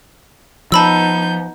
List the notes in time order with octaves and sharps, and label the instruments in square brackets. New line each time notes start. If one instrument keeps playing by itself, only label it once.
[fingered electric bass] F3 [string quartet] B3 D#4 G6 [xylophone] A5 B5 E6